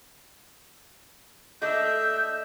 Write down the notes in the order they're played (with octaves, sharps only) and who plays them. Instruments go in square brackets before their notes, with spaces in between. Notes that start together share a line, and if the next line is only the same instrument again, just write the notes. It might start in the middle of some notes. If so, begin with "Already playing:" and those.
[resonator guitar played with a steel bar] A3 D4 [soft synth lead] D#5 [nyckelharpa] E5 [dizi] G6